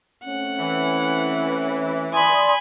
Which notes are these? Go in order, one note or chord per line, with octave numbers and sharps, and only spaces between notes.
A3 C4 C#4 F#5
E3
D5 G#5 B5 C6 D#6